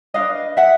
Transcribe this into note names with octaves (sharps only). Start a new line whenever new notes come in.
D4 F#4 B4 D#5 F5
E5 F#5